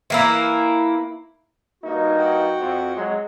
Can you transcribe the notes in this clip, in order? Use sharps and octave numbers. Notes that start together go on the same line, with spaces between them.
E3 A#3 E4
G2 A#3 D#4 F#4
F#4 F#5 G5
F2
F#3 G#3